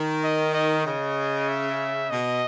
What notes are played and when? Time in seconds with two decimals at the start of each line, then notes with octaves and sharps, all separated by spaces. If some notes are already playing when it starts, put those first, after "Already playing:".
Already playing: D#3
0.24 D#5
0.54 D#5
0.86 C#3 D#5
1.49 E5
2.10 B2 D#5